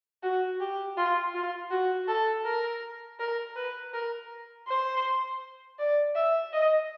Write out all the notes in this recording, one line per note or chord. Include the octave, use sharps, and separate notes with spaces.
F#4
G4
F4
F4
F#4
A4
A#4
A#4
B4
A#4
C5
D5
E5
D#5